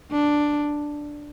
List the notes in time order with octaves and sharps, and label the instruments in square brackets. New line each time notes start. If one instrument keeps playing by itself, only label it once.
[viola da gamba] D4